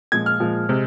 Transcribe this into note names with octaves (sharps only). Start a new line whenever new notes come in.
A#2 F3 G#3 G#6
F6
A#2 F3 G#3
C3 G#3